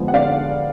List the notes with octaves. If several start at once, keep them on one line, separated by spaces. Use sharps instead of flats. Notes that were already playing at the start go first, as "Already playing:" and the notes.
Already playing: D3 F3 G#3 B3
F#5
D3 D5 F5